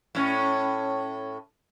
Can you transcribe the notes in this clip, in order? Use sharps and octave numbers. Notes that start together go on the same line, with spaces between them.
A2 C#4